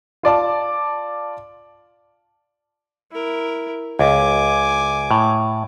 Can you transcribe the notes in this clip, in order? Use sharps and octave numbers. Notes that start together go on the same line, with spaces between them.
F4 D5 A5 D6
E4 A#4
C#2 G#5 D6
A2